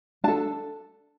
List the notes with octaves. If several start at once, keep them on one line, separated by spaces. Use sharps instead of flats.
D4 A4 A5